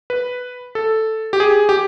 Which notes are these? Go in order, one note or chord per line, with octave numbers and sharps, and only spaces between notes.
B4
A4
G4
G#4
G4